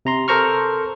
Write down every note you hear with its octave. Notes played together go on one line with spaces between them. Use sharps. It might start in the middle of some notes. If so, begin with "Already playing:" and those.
C3 A#5 C6
A4 A#4 C5 A#5 C#6 F6